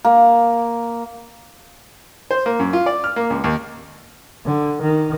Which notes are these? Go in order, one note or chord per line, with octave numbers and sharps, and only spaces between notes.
A#3
C5
A#3
F#2
F4
D5
F6
A#3
C#2
D#2
D3
D#3